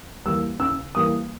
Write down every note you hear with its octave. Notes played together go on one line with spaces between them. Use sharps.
E3 G3 A#3 E6
C#3 E6
E3 G3 A#3 D#6